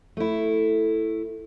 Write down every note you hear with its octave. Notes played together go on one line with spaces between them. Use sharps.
A3 E4